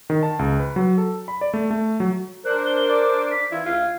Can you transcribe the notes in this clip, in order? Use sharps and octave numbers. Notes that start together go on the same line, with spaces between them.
D#3
A5
C#2
B4
F#3
A4
B5
D5
A3
A3
F#3
D4 A#4 C5 F#6
G7
D5 D6
B6
E3 E4 F4 G#6
D2 F4